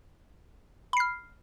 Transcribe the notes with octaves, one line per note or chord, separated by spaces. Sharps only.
B5 F6 C7